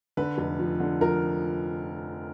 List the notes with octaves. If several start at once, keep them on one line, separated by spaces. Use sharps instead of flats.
D3 B4
F1
F3
D3
F3 A#4